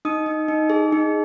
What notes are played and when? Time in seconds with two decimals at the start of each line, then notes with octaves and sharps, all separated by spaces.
0.05 D#4 D#6
0.26 D#4
0.48 D#4
0.70 G#4
0.92 D#4